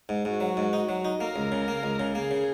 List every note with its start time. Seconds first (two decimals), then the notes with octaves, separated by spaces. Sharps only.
0.09 G#2
0.25 G#2 F#4
0.40 F#3
0.57 G#2
0.73 D#4
0.89 F#3
1.05 D#4
1.20 A#3 A#4
1.36 C#2
1.52 C#3
1.68 A#3
1.83 C#2
2.00 C#3
2.15 A#3 G#4
2.31 C#3